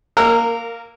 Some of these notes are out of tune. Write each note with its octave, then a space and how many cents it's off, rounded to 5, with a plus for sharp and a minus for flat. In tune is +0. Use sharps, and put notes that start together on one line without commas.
A#3 +0 A#4 -20 E6 +25